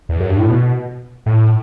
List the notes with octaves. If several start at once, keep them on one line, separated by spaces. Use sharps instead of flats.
E2
F#2
G2
A2
B2
A2